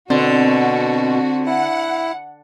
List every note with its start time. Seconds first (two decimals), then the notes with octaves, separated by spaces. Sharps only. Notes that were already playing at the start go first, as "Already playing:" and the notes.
0.10 B2 D3 C4 F#4
1.46 E4 F#5